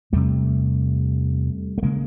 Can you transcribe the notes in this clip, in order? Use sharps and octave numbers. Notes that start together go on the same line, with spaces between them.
E2 C3 G3 A3
A3
C#3 G#3 A#3